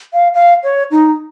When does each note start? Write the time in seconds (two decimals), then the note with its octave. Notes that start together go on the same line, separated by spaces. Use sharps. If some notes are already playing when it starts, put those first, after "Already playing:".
0.13 F5
0.34 F5
0.64 C#5
0.91 D#4